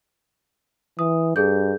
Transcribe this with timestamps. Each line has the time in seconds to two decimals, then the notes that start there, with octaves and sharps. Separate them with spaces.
0.99 E3 D#6
1.36 G2 G#4 A4 G6